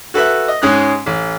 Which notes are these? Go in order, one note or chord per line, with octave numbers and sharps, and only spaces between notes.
F#4 A4 B4 E5 F#6
D#5
G#2 G#3 C#4 D#6 F#6
A1